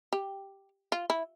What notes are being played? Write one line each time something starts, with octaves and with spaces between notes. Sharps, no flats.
G4
F4
E4